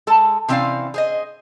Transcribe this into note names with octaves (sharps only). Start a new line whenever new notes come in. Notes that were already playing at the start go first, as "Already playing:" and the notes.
G#3 A4 A5
C3 E3 C4 C#4 D5 F5
G#4 C5 D#5